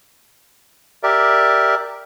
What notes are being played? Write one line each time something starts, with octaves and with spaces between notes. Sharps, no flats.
G4 A#4 D5 E5